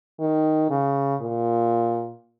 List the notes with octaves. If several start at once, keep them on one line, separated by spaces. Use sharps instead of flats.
D#3
C#3
A#2